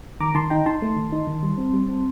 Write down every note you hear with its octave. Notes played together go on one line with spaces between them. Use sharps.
D#3 A#5 D6
D#3 A5 C6
D#4 G5 A#5
D#4 A5 C6
A3
D#3
D#4
D#3
G3
C4
G3
C4